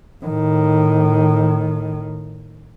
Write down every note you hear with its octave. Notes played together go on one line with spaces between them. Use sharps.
A2 D#3